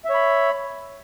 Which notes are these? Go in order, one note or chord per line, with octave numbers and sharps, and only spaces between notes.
C#5 E5 B5